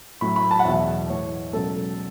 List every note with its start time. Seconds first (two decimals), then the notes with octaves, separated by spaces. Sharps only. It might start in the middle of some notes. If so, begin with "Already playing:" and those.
0.21 A2 F#3 B5
0.36 B5
0.51 A5
0.59 F#5
0.65 E2 B2 F#3 E5
1.09 A2 E3 C#5
1.53 C#2 B2 F#3 A4